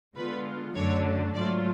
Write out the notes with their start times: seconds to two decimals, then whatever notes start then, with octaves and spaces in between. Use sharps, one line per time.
0.16 D3 G#3 B3 F4 B4
0.75 F#2 D3 F#3 A3 D4 C#5
1.34 G#2 F#3 A3 F4 D5